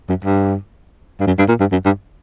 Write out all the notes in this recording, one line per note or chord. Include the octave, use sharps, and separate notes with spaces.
F#2
G2
G2
F#2
G2
A#2
G2
F#2
G2